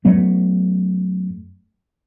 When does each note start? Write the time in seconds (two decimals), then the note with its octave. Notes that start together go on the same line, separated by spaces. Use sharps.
0.05 F#2 F#3 A3 B3